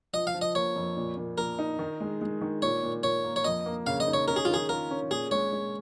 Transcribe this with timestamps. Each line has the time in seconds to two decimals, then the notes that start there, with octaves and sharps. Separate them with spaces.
0.14 F3 D#5
0.27 F5
0.34 F3
0.42 D#5
0.55 A#3 C#5
0.76 F2
0.97 A#2
1.17 A#2
1.38 A#2 A#4
1.59 D#4
1.79 D#3
2.01 G#3
2.21 G#3
2.41 D#3
2.62 A#2 C#5
2.83 A#2
3.03 A#2 C#5
3.24 A#3
3.36 C#5
3.45 F2 D#5
3.66 A#3
3.87 C#3 F5
4.00 D#5
4.07 D#4
4.14 C#5
4.28 C#4 A#4
4.36 G#4
4.45 D#3 F4
4.54 G#4
4.69 F4 A#4
4.91 C#4
5.11 A#2 G#4
5.31 G#3 C#5
5.52 G#3